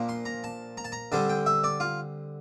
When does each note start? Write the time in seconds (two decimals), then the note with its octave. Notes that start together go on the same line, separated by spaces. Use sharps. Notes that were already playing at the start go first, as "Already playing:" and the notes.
Already playing: A#2 F3 A#3 D4
0.09 C6
0.25 A#5
0.44 A5
0.77 A#5
0.84 A5
0.92 A#5
1.12 D3 G3 C4 A5
1.29 G5
1.46 E5
1.64 D5
1.80 F4